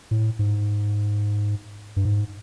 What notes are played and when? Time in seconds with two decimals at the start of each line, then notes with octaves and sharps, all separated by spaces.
0.11 A2
0.39 G#2
1.96 G2
2.05 G#2